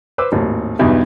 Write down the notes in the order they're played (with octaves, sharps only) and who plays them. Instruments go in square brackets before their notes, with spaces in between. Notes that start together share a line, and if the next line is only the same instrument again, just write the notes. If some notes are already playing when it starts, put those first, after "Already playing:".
[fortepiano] B4 C5 D6 E6
G#1 D#2 A2
B1 E2 G2 D#4 E5